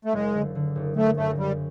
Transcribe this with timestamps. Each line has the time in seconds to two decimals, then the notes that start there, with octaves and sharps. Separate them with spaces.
0.05 A3
0.13 F#1 G#3
0.34 D3
0.55 D3
0.75 F#1
0.96 F#1 A3
1.17 F#2 A3
1.38 F#2 G3